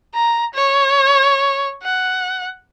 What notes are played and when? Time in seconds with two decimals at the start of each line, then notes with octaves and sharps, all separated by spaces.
0.14 A#5
0.54 C#5
1.83 F#5